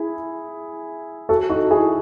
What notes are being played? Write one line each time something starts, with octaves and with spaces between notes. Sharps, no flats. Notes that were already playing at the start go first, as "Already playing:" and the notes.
Already playing: E4 G#4
F#4 A4
D#4 F#4
E4 G#4